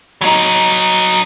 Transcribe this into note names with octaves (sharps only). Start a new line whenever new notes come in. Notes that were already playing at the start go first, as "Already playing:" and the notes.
F#3 D#4